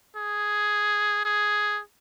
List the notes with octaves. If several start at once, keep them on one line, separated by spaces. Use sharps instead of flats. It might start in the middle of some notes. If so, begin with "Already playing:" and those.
G#4
G#4